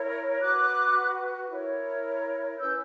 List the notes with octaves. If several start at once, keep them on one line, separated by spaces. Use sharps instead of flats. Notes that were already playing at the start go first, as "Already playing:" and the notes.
Already playing: E4 A#4 C#5
F#4 B4 D6 F#6
E4 A#4 C#5
C#4 E4 B4 E6 G6